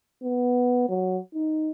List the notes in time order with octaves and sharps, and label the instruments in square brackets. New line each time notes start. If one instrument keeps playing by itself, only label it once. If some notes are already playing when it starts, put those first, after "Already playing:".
[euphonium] B3
F#3
D#4